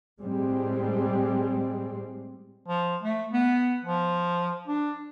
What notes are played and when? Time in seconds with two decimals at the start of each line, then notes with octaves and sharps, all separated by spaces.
0.21 A2 G3 G#3 C4
2.68 F3
3.03 A3
3.33 B3
3.85 F3
4.67 D4